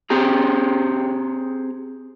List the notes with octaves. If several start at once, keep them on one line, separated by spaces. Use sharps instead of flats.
C4 G4 G#4 A#5